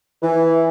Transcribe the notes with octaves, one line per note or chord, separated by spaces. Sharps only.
E3